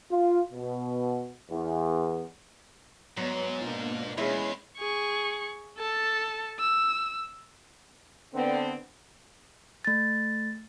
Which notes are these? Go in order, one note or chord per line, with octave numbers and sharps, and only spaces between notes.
F4
B2
E2
G#2 F#3 B3
B2 A#3 D4 F4
E2 G#3 C#4 E4 C7
G#4 C#6
A4 A5
E6
D3 B3 C4
A3 A6